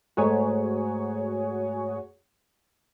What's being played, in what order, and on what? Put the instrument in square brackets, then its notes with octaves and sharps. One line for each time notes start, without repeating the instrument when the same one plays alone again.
[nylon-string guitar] G#2 A3 [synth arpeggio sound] F#4 G#4 C#5